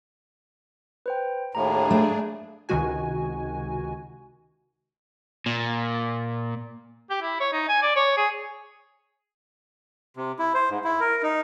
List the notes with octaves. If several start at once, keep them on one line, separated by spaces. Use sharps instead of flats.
B4 C5 G5
D#2 A2 D4 G#4 A#5
A3
C#2 C3 D#3 G#3 F#4 G#5
A#2
G4
E4
C#5
D#4
G#5
D5
C#5
G#4
C3
E4
C5
G#2
E4
A#4
D#4